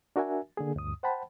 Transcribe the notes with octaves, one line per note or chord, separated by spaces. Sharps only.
D4 F#4 A#4 E5 G#5
D3 A#3 G#4
D2 G2 D#6
C5 F#5 G5 A5 B5